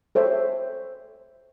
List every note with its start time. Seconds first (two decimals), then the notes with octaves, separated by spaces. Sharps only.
0.15 A4 C5 C#5 E5